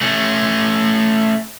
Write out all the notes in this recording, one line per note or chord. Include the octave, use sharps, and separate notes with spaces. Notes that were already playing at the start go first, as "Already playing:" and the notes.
A3 C#4